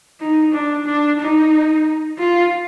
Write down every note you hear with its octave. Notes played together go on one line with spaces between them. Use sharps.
D#4
D4
D4
D#4
F4